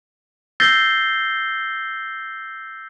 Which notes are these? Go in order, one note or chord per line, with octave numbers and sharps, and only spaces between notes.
E6 G6 A6 A#6 C7 G7